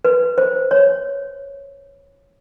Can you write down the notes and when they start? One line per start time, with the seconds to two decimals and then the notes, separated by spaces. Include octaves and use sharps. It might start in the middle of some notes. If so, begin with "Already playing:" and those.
0.05 B4
0.38 C5
0.71 C#5